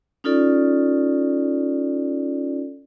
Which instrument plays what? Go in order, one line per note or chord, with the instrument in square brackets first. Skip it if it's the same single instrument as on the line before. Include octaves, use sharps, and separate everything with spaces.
[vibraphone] C#4 D#4 F4 A4 D5